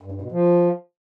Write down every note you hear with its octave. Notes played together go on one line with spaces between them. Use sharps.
G2
G2
B2
F3